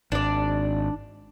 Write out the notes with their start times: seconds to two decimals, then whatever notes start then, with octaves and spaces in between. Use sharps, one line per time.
0.12 G#1 D4 D5